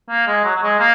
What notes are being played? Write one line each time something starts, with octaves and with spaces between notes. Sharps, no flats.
A#3
G#3
F#3
F#3
G#3
A#3